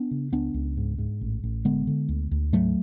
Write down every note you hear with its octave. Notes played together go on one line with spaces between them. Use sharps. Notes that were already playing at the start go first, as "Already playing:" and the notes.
Already playing: B3 D4
C#3
C#2 B3 D4
C#2
G#2
G#2
A1
A1
D3 G#3 B3
D3
D2
D2
G#2 F#3 A3